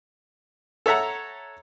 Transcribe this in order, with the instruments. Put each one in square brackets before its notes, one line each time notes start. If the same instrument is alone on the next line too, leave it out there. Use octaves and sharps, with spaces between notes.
[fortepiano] A4 C#5 E5 F#5 A#5